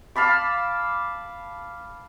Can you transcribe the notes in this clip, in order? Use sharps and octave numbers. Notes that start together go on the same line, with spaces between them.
F5 A5 B5 D6